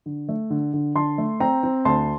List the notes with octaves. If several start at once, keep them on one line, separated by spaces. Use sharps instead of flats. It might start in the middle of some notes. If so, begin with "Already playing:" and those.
D3
A3
D3
D3
D3 A5 C6
A3
C4 G5 A#5
C4
D2 A5 C6